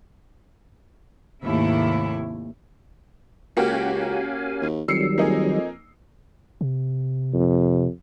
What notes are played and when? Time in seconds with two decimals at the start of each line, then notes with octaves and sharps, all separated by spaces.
1.43 D#2 G#2 C3 A3 E4
3.57 C#2 A#3 C#4 F#4 G4 F5 G#5
4.62 D#2
4.88 F2 D#3 F#3 G3 E6 C7 C#7
5.18 F2 A#3 D#4 G#4
6.61 C3
7.33 F2